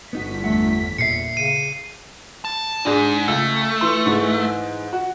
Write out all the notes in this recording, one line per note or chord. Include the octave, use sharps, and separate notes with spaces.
G1 B3 D#4 F#4 B6
E2 A3 E5 F#5
E2 A#2 E5 C7 C#7
C#3 D#7
A5
G#2 D4 G#4
C#2 A3
E3 C6
G#2 E3 G#4
F#4